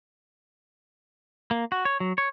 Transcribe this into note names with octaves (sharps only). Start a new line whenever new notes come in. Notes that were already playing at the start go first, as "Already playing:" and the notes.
A#3
F#4
C#5
F#3
C#5